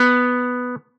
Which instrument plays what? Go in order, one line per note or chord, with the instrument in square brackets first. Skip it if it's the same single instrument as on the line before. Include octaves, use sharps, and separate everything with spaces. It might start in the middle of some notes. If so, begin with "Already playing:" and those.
Already playing: [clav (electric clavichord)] B3